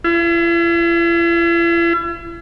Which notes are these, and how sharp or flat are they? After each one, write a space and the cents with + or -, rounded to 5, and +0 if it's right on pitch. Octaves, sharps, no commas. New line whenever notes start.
E4 +45